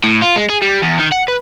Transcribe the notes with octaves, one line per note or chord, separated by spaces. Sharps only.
A2
F4
G#3
G#4
G3
E2
D#3
F#5
B4